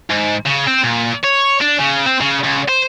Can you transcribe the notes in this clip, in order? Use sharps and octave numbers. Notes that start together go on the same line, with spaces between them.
G#2
C#3
C4
A#2
C#5
D4
C#3
C4
C#3
C#2
C5